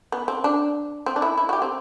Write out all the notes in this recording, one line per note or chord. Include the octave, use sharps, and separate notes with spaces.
B3
C4
D4
C4
D4
E4
E4
F#4
G4
C4